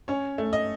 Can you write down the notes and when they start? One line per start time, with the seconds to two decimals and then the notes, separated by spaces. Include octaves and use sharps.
0.08 C#4 C#5
0.38 A3
0.53 D#5